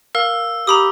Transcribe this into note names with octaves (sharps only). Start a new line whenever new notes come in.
A#4 F5 E6
G4 A#5 B5 D#6